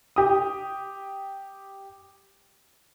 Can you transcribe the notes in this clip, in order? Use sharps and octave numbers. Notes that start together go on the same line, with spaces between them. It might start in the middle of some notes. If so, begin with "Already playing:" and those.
G4 D#6